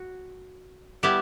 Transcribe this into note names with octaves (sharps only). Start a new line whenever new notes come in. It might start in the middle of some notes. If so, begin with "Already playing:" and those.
Already playing: F#4
G3 B3 E4 G4